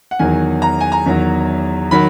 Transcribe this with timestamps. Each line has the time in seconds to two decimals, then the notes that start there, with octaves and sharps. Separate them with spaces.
0.11 F#5
0.19 E2 D#3 F#3 G#5
0.62 A#5
0.81 G#5
0.92 A#5
1.06 E2 D#3 F#3
1.91 D#3 F#3 B5